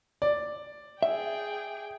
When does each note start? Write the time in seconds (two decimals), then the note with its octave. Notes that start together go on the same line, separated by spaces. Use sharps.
0.22 D5
1.03 G#4 E5 G5